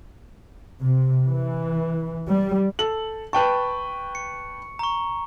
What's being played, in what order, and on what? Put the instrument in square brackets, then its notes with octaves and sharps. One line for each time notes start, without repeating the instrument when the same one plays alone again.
[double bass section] C3
E3
G3
[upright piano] A4 F#7
[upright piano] B4 G5 A5 [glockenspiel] C#6
[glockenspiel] C#7
A#5 C#6